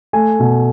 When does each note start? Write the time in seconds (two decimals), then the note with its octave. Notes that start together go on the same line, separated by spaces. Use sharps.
0.13 A3 G#5
0.40 B2